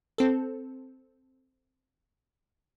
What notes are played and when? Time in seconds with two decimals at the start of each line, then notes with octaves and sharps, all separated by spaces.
0.18 C4 A4